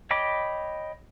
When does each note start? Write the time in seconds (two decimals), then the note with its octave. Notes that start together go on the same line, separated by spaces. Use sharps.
0.11 C#5 D#5 G5 B5 D6